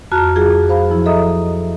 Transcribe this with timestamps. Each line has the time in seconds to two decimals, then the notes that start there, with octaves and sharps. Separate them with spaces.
0.12 F2 F#4 A5 A#5 F6 F#6
0.36 F#3 F4 G#4
0.69 C5 F5 B5
0.90 F3 E4
1.06 A4 D#5 E5 A#5 D#6